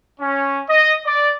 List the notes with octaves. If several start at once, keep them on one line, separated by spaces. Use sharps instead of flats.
C#4
D#5
D5